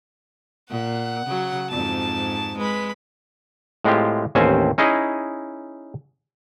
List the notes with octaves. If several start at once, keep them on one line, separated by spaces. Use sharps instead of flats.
A#2 F#5
C#3 F#3
F2 G#2 A5
G#3 B4 B5
A2 G#3 C4 F4 G4
A1 D#2 C4 C#4 C5 G#5
C#4 D#4 E4 G#4 D#5